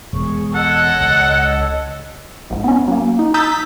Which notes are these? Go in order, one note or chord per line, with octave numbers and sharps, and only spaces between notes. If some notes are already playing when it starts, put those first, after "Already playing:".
E1 G#3 G#4 C#6
A4 C#5 D#5 F#5
C#2
A#1 G#2
B3 C#4
F#3 A#3
D#4
A#5 D#6 E6 G6 A6 B6
B6